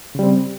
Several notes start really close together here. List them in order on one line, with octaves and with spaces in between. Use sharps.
C#3 G3 C4